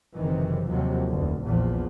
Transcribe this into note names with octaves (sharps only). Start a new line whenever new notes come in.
F#1 C3 D#3 E3
D#2 C3 F3 F#3
F1 D2
A#1 E2 A#2 F3